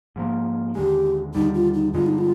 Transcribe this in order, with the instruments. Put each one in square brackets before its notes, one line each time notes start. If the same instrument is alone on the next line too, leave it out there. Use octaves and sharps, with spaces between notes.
[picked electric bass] G#2 F3 A#3
[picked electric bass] D#2 D3 G#3 [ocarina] G4
[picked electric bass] D#2 D3 G3 [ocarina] D#4
[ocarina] F4
D#4
[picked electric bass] G2 D3 G#3 [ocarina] F4
[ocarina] D#4
F4